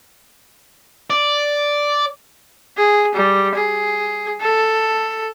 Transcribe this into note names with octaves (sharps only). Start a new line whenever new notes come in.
D5
G#4
G3
G#4
A4